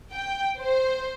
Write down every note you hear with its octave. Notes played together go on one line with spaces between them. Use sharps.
G5
C5